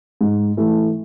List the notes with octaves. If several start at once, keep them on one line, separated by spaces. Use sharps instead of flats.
G#2
E3 A3